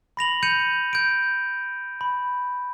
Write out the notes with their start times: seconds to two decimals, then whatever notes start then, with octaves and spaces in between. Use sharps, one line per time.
0.17 B5 A#6 F7 F#7
0.43 G6 C#7 D#7 F7
0.93 G6 D7
2.01 B5